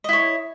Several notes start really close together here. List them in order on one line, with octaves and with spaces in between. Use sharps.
D#5 E4 C#5